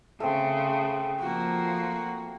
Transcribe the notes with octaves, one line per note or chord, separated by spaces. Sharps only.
C#3 A3 C4
F3 A#3 F#4